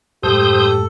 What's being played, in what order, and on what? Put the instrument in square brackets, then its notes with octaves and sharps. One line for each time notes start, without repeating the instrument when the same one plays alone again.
[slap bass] F#2 A2 G#3 [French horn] G4 [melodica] A4 [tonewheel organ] C5 D#6 G6